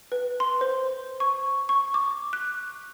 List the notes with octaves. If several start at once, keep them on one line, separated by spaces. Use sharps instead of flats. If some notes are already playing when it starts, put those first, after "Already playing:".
B4
C6
C5
C#6
C#6
D6
F#6